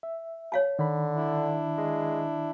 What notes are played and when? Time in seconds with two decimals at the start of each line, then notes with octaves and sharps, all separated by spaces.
0.03 E5
0.52 C#5 F5 A5
0.79 D3 D#3 B5
1.15 D4 E4
1.78 G#3